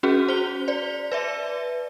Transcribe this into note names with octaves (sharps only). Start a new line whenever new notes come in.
C#4 F#4 G#4
C5 G7
C5 D5
B4 D5 E5